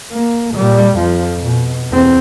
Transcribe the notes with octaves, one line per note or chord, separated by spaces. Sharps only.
A#3
A#2 G3
F2 F3
B2
E2 C4